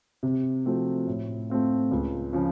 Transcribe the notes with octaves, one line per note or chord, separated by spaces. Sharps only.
C3
F3 A3 C4 F#4
A2
A3 C4 F4
C#2
C#3 F3